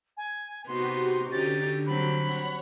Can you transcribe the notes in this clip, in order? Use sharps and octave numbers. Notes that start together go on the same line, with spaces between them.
G#5
C3 B3 D#4 F#4 G4 C6
D3 C#4 D#4 G4 A6
F#3 G3 C4 B5
C#5 F#5